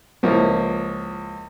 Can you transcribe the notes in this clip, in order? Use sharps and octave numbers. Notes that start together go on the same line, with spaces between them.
C#2 F3 A#3 E4